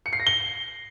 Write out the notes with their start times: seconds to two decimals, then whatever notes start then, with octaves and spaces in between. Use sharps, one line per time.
0.06 C#7
0.13 C7
0.20 A#6
0.27 G7